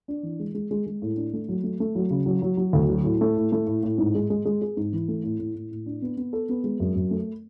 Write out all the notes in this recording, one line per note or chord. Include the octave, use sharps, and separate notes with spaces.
D4
E3
G#3
G#3
G#3
G#3
A2
D4
A3
F#3
A3
A3
F#3
C#3
F#3
F#3
F#3
D2
F#3
A2
A3
A2
A3
A2
A2
G#2
G#3
G#3
G#3
G#4
G#2
E3
A3
A2
A2
A2
A2
D4
B3
B3
A4
B3
G#3
F#2
F#2
A3